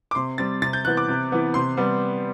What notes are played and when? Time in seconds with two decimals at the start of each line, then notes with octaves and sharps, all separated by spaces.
0.11 D6
0.15 C3 C6
0.38 G3 C4 A6
0.62 C3 A6
0.73 G6
0.85 E3 B3 F#6
0.97 D6
1.08 C3
1.32 E3 B3
1.54 C3 C6
1.77 G3 B3